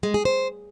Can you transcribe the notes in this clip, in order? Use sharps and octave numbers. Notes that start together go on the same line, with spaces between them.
G#3
G#4
C5